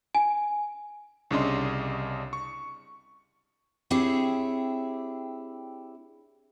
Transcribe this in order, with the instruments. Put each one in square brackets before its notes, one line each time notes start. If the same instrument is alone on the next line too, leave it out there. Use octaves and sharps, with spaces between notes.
[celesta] G#5
[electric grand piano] C2 C#3 D4 D#5 C6
C#6
[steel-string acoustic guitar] C4 D4 E4 G4 G#4 C#5